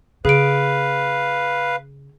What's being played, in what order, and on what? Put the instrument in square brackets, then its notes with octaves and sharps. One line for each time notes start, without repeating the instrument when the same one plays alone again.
[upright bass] C#3 [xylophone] G#4 D7 [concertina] B4 F5